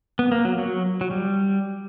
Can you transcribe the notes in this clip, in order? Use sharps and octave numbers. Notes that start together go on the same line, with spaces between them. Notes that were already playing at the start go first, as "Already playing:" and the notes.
B3
A#3
F#3
F#3
F#3
G3